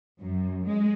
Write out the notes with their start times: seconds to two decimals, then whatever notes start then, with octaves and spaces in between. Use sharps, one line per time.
0.20 F#2
0.63 G#3